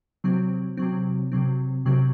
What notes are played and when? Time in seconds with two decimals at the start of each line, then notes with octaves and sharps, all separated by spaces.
0.24 C3 F#3 C4
0.77 C3 F#3 C4
1.32 C3 F#3 C4
1.85 C3 F#3 C4